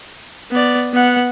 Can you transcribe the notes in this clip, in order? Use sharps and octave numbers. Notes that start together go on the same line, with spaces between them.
B3 D5
B3 F#5